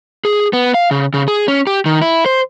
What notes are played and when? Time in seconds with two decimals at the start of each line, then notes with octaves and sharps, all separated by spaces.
0.25 G#4
0.53 B3
0.74 F5
0.91 C#3
1.14 C#3
1.28 G#4
1.48 C#4
1.67 G4
1.85 D#3
2.02 E4
2.26 C5